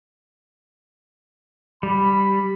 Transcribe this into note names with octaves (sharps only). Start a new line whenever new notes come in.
G3 B5